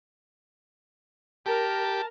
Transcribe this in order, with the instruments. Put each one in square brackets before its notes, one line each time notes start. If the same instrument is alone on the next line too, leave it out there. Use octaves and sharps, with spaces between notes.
[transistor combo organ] G4 [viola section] A#4 [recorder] A5